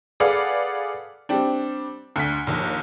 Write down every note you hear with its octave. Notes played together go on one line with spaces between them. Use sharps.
G#4 A4 B4 D5 F5 F#5
G3 C4 D4
D2 B6
A#1 D#2